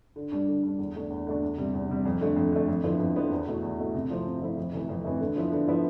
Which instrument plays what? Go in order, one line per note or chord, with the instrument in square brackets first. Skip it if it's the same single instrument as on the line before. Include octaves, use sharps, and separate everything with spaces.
[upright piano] D3
G3 D4
D3
G3 D4
E2
D3 A3 D4
E2
D3 A3 D4
E2
C3 G3
E2
C3 G3
F2
D3 A3
F2
D3 A3
F2
D3 F3 B3 E4
F2
D3 F3 B3 E4
E2
B2 A3 E4
E2
B2 A3 E4
C3
F3 A3 C4 E4
C3
F3 A3 C4 E4
F2
C3 E3 A3
F2
C3 E3 A3
D3
F3 B3 E4
D3
F3 B3 E4